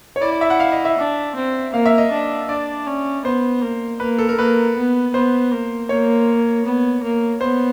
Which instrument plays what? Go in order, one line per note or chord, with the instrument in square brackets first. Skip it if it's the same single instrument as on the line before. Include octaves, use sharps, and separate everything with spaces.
[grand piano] C#5
[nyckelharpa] E4 [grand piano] D5
[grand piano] D5
E5
F#5
F5
D#5
E5
[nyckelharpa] D4
C4
[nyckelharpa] A#3 [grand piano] F5
[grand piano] E5
D#5
[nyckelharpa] D4
[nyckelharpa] D4 [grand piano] D5
[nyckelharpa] C#4
[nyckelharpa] B3 [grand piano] C5
[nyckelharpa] A#3
[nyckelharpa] A#3 [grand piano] B4
[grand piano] A4
A#4
[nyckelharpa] A#3 [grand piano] B4
[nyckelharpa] B3
[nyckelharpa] B3 [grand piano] C5
[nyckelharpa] A#3
[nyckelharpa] A#3 [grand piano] C#5
[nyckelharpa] B3
A#3
[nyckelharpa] B3 [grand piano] C5